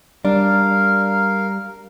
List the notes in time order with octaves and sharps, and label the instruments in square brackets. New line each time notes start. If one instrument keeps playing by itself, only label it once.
[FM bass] G3 [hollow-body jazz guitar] D4 [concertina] A#4 F5